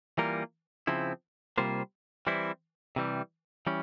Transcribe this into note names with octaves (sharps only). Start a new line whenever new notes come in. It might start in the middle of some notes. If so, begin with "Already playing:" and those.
E3 G3 A#3 F4 A#4
C#3 F3 C4 E4
C3 G3 A#3 F4 C5
E3 G3 C4 E4
C3 E3 G3
E3 G3 C#4